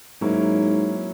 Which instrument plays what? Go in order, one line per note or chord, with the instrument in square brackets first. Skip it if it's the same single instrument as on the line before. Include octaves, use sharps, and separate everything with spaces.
[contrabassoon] G#2 [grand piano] F#3 A#3 C#4 E4